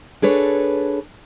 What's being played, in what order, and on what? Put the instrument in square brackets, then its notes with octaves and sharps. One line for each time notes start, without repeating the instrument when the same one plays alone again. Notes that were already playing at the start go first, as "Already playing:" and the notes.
[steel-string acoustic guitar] D4 G#4 A4 B4 C#5